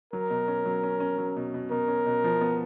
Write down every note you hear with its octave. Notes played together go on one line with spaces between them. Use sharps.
F#3 A#4
B2
C#4
F#3
C#4
C#4
F#3
B2
B2
B2 A#4
C#4
B2
F3
B3